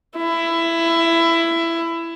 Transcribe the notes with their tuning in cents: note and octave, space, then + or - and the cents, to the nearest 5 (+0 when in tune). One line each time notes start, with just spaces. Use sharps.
E4 +15